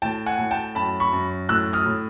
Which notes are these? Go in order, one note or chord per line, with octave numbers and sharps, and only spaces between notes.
A2 G5 A5
F#5 G#5
A2
G5 A5
F#2 A5 B5
B5 C#6
F#2
A2 E6 F#6
D#6 F6
A2